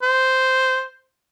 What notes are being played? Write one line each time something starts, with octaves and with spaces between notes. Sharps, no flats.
C5